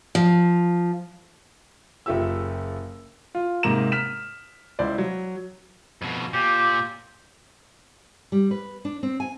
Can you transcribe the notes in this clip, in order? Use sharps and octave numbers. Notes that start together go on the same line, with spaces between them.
F3
F#1 F4 G4 E5 E6
F4
G#2 C3 A#3 A#5 E7
F6 B6 E7
C#2 E4 C5 D5
F#3
F2 B2
A#2 G4
G3
B4
D4
C4
G#5